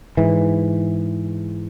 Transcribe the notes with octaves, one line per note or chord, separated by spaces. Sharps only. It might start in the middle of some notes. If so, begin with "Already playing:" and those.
G#2 E3